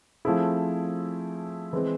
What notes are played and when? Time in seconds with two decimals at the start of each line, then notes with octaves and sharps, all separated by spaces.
0.25 F3 A3 C4 E4 G#4
1.73 E3 G#3 C4